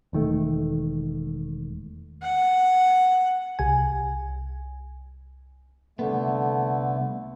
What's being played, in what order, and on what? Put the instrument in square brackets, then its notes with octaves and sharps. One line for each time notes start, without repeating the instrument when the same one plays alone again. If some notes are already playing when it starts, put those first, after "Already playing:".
[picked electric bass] E1 D#3 A3
[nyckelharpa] F#5
[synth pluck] C2 G#5
[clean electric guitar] C2 B3 [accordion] D3 A3